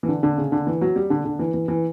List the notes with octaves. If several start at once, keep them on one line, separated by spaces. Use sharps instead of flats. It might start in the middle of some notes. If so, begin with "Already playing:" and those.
E3
D3
D3
C#3
D3
E3
F#3
G3
D3
D3
E3
E3
E3